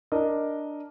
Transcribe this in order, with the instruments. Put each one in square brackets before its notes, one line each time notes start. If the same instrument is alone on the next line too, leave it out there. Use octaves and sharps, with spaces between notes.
[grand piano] D4 A#4 D5 D#5